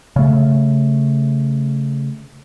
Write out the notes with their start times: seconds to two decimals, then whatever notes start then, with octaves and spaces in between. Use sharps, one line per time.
0.16 C#3 A3